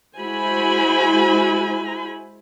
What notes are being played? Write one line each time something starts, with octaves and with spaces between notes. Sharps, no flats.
G#3 E4 F#4 C5 G#5 B5